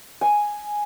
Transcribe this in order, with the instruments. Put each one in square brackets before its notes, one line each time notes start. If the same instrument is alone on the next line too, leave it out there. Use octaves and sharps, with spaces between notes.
[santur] G#5